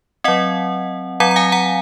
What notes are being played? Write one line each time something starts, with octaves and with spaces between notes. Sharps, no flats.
F#3 C4 D#5 F#5
F#3 C4 F#5 A#5
A#5
F5 G#5
F#5 A#5